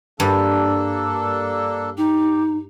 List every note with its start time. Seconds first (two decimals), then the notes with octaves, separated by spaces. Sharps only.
0.20 G2 A#3 D4 A4 A5
1.98 D#4 G4